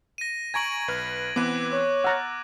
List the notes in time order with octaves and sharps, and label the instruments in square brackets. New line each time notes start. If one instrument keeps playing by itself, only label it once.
[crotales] A#6 D#7
[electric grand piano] G#5 A#5 C#6 [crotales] G#6 D7 F#7
[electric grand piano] B1 B4 F6
[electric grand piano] E3 C4 B4 [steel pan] B3 [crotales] D6 F#6
[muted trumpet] C#5
[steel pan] F#5 A#5 [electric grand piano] E6 F6 A6